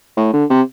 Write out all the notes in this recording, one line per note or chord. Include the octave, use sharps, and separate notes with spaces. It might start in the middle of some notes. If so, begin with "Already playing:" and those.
A2
D3
C3